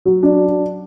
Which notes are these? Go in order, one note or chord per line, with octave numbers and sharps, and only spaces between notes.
F#3
D4